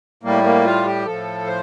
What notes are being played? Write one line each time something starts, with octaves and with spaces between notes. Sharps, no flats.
A2 G3 A#3
A#3
F4
G4
A2 F3 A4
C5